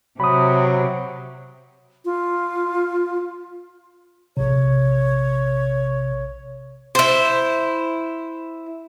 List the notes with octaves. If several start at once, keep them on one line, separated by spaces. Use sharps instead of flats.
C3 F#3 B5 D#6
F4
A#1 C3 C#5
E4 C5